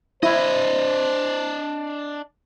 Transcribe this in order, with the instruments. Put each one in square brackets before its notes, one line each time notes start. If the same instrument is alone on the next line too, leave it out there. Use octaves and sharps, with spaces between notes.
[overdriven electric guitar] D4 D#5 [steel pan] E4 [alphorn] C5